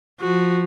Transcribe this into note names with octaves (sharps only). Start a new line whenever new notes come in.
F3 F#4